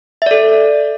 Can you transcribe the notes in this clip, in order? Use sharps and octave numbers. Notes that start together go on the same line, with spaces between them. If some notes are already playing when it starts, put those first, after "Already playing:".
A4 D5 E5